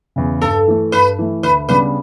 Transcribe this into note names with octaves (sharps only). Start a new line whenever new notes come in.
E2 C#3
G2 A4
E3 A3
G2 B4
E3 A3
D2 B4
C#3 G3 B3 D4 B4